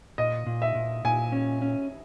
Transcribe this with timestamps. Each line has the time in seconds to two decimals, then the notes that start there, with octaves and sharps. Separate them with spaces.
0.18 A#2 D#5
0.46 A#2
0.62 E5
0.75 A#2
1.04 A#2 G#5
1.32 C#4
1.62 C#4